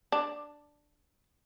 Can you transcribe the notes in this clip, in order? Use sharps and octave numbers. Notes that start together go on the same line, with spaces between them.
D4